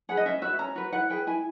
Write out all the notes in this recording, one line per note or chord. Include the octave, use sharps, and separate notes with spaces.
G#4 B4 F#5
D#5
C#4 E5
F#4 B4 E5
C#4 A#5
F#4 B4
E4 F#5
G#4 B4 G5
E4 G#5